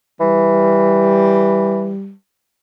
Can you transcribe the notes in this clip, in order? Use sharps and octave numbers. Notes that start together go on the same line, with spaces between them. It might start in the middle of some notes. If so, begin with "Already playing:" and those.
E3 G3